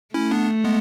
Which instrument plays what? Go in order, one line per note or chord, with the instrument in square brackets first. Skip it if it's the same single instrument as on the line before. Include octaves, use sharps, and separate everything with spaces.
[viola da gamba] A3 [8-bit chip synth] C#4 E4
[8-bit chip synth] B3 D4
G#3 B3